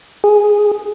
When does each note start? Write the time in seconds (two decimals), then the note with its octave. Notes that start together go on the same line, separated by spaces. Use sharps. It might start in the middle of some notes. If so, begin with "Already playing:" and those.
0.24 G#4